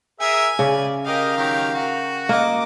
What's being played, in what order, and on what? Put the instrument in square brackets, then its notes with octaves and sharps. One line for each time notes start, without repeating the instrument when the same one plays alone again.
[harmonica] G#4 A#4 E5 [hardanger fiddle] G#5
[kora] C#3 [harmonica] D5
[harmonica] G4 D#5 [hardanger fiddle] A#4 F5
[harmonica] D#3 F#3 G4
F#4
[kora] A#3 [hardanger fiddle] D#5 D6